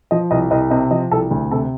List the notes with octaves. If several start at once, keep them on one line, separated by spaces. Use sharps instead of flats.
F3 D#5
C2 D#5
C2 D#5
C3 D#5
F3 D#5
C2 A4
D2
C3 A4